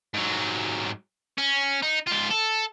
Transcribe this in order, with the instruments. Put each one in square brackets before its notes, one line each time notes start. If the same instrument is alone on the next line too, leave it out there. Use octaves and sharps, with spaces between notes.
[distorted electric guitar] G#2 F#3
C#4
D#4
G#2 F4
A4